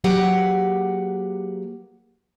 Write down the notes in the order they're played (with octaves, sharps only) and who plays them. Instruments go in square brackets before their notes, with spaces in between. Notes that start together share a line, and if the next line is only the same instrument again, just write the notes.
[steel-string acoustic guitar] F#3 A#3 G4 G#4 B4 F#5